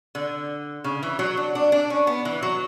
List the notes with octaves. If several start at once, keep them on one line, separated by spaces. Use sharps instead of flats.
D3
C#3
E3
F#3
D4
D4
D4
C#4
B3
E3
F#3